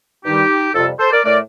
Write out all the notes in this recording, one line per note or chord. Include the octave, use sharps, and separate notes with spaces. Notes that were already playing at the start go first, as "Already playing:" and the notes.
G2 D#3 G3 D#4 G4
F2 C3 G3 F4 A4
A4 C5
A#4 D5
A2 A3 A#4 D5